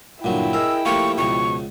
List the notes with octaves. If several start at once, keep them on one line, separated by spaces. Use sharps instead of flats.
G2 A#2 D3 F#3 E4 G5
G#4 A#4 D#5 G#5 E6
F3 A3 A#3 F4 G4 A4 C#6
C#2 B2 F3 F#4 C#6